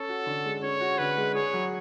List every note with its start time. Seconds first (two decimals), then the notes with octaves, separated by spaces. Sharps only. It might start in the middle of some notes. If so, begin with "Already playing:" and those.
Already playing: C#4 A4
0.09 F#4
0.26 D3
0.45 G#3
0.62 C#4 C#5
0.80 F#4
0.98 D3 B4
1.17 G#3
1.35 G#4 C#5
1.53 F#3